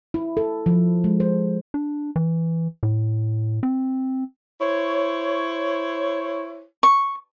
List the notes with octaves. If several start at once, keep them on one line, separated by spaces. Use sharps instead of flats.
E4
A4
F3
G#3
C5
D4
E3
A2
C4
E4 C5 C#5
C#6